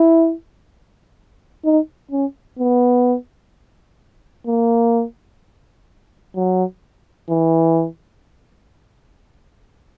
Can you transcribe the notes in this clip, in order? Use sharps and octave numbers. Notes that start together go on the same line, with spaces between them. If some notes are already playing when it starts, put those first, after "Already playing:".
Already playing: E4
D#4
C#4
B3
A#3
F#3
E3